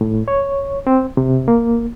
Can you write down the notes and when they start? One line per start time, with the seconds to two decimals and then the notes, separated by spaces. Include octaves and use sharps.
0.01 A2
0.28 C#5
0.87 C4
1.17 C3
1.48 A#3